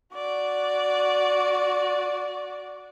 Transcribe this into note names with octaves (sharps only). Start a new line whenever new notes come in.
F#4 D5